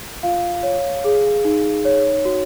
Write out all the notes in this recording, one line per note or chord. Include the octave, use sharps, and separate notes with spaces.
F4 F5
C#5
G#4
D#4
C#5
F#4